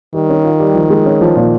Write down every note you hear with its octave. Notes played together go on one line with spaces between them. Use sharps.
D#3 G3
C#4
F4
G3
F3
G#3
C#4
F3
A#2